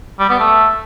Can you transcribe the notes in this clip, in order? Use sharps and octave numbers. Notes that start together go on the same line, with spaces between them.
G3
B3
A3